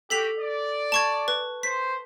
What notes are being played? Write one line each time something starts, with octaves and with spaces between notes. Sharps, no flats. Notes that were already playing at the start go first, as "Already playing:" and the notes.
F#4 G4 A4 B6 F7
D5
A5 C#6 G#6
B4
C5 B6